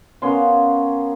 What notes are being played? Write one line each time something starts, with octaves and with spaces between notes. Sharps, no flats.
A#3 B3 C#4 C6